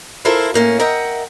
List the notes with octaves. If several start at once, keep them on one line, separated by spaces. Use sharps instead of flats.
E4 F4 A4 A#4 C5 E5
A2 A#3 C#4
A#4 D#5 E5 F#5 G5